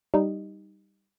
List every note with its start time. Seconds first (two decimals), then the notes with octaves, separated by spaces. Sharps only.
0.14 G3 D#4